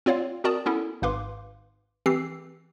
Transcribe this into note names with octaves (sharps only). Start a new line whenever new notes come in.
C4 F4 C#5 D5 F5
C4 F#4 A#4 D5 A5 D#6
B3 C#4 E4 A4
G#1 G#2 B4 F5 C6 D6
E3 C4 G4 E6 C7